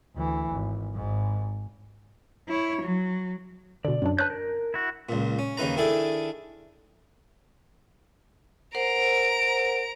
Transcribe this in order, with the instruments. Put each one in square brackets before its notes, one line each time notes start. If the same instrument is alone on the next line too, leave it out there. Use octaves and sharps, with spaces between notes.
[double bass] D2 E3
G#1
G#1 G#2
[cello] E4 C#5
F#3
[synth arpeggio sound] B2 D3 [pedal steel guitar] D5
[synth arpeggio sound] F#2 F#3 D4
[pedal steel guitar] B4 F#6 G6 [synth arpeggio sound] C#5 A5
[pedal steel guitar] A#4
E4 F#4
[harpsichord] C#2 A#2
C#4
D#2 C#3 D#4 B4 A#5
D#3 D4 E4 G#4 A4
[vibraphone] A#4 C5 F#5 [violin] A#5 D7